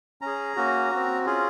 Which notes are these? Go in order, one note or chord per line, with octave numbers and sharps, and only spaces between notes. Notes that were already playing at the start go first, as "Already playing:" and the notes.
C#4 G#4 A#5
A#3 C#4 F#4
C4 F#4
C#4 F4 G#4